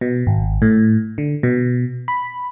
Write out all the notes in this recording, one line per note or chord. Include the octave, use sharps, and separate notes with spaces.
B2
G#1
A2
D3
B2
B5